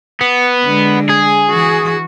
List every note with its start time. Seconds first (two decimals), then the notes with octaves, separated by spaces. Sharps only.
0.21 B3
0.65 D3 G#3
1.09 G#4
1.50 E3 F#4